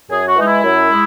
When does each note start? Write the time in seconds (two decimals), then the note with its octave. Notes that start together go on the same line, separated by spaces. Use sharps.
0.10 F#2 G#4
0.28 F#4
0.37 E3 G#3 D#4
0.46 E4
0.63 F#2
0.90 G#3